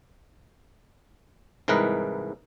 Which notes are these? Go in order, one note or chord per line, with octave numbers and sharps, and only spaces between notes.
C2 G#2 E3 A#4 B4 D#5